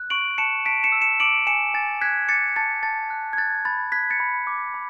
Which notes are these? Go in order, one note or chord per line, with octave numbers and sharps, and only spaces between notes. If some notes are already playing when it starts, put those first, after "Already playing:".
Already playing: F#6
C#6 D7 F#7
A5 C#7 E7
A5 B6 D7
C#7 E7
E6
C#7 E7
D6 D7 F#7
G#5 C#7 E7
G#5 A6
F#6 G#6 B6
D6 A6 C#7
A5 A6 C#7
A5 A6
F#6
G#6
F#6 A6
B5 A6
F#6 G#6 B6
A6 C#7
B5
D6
B5